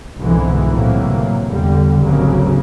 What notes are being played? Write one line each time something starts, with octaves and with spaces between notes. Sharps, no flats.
C2 G#2 B2 D3 E3
A2 C3 E3 F#3 A#3
E2 D3 G3
G#1 D2 G#2 C#3 F#3 A#3